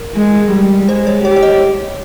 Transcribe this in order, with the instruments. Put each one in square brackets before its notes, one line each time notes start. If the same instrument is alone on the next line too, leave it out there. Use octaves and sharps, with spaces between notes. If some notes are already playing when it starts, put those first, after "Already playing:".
Already playing: [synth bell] A#4
[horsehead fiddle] G#3
G3
[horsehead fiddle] G#3 [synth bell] C5
[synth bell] C#5
[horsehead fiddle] G4 [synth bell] C#5
[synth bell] C#5
D#5